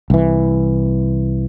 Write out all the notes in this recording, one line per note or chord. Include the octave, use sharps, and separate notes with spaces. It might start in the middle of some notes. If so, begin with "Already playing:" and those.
C2 E3